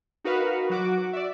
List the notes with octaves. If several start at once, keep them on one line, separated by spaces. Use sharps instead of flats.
D#4 F#4 A#4 B4 F5
F#3 F#4 D6
D5 E5